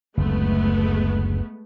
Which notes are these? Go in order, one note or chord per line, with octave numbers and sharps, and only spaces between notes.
F#1 D2 G#3 A3 B3